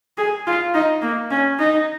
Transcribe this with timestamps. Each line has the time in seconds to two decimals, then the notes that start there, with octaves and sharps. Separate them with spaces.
0.17 G#4
0.46 F4
0.74 D#4
1.02 A#3
1.31 C#4
1.58 D#4